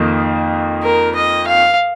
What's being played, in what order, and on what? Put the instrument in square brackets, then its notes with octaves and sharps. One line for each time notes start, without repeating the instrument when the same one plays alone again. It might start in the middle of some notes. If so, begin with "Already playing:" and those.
Already playing: [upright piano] F2 D#3 A#3 D#4
[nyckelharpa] A#4
D#5
F5